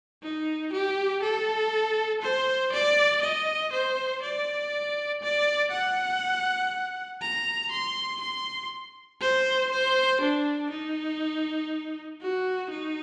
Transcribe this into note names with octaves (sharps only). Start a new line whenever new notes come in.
D#4
G4
A4
C5
D5
D#5
C5
D5
D5
F#5
A#5
C6
C6
C5
C5
D4
D#4
F#4
D#4